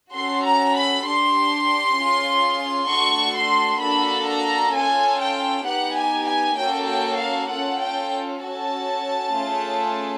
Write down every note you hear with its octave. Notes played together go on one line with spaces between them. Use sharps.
C#4 F#4 A4 C6
A#5
B5
D4 G4 C6
C#4 F4 G#4
A3 D4 F#4 A4 C#6
C6
A#3 D4 F#4 A4 B5
A#5
C#4 F4 A4 G#5
G5
B3 D#4 G4 F#5
G#5
G#5
A#3 C#4 F#4 A4 G5
G5
F5
C#4 F4 A4 F#5
G5
C#4 F#4 A4 A5
A3 C#4 F4 G#4